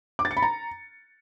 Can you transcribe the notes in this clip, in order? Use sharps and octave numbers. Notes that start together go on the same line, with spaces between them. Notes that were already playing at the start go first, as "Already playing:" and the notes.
D6
A6
C#7
B5
A#5